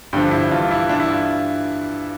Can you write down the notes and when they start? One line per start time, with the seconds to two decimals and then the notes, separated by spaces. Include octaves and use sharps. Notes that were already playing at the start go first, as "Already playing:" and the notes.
0.13 G2 D3 F3
0.31 E4
0.51 G2 E3 F4
0.71 E4
0.89 G2 E3 D4
1.00 E4
1.10 F4